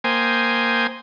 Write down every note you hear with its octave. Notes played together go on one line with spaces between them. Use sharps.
A#3 C5 G5 G#5 D#6